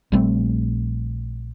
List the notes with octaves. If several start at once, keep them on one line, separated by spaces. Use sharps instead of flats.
A#1 G3 A3 C4